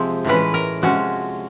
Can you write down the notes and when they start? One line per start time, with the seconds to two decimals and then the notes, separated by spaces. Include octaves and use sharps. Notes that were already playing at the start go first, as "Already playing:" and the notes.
Already playing: C3 F3 G#3 C4
0.24 A2 E3 G#3 C#4 B4
0.54 A#4
0.82 C3 F3 G#3 C#4 F#4